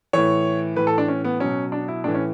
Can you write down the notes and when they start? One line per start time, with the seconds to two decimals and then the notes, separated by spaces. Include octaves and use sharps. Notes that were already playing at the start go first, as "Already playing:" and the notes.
0.13 A2 E3 C#5
0.76 A2 E3 B4
0.87 A4
0.98 D4
1.08 C#4
1.24 B3
1.40 B2 F#3 C#4
1.72 D4
1.88 E4
2.04 A2 E3 D4
2.15 C#4